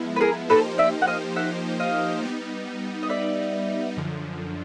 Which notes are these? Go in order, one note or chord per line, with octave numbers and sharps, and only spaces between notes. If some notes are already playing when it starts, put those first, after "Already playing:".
Already playing: F3 G#3 B3 E4
B4
G#4 A#4
F3 A#3 D#4 G4 A4 B4 C5
D5 E5
F#5
D#5 F5
E5 F#5
D#5 F5
G3 B3 D#4
D#5
D5 E5
F#2 D3 F3